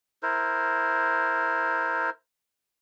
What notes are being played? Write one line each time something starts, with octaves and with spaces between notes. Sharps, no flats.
E4 A#4 C5